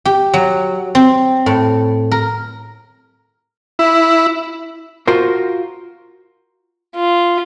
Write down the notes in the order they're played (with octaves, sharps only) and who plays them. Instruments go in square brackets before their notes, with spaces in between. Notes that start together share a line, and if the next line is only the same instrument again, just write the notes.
[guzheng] G4
F#3
C4
A2
A#4
[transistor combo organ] E4
[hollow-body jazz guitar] F4 F#4 A#4 C5
[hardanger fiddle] F4